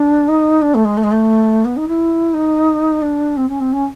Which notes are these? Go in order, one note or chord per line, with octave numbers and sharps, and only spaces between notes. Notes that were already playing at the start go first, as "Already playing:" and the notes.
Already playing: D4
D#4
D4
A3
G#3
A3
G#3
A3
B3
D#4
E4
D#4
D4
C4
C#4
C4
C#4